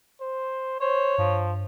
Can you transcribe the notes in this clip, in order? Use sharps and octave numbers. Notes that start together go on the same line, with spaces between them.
C5
C5 C#5
G2 F3